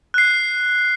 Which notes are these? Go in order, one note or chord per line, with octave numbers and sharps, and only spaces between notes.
F#6 C7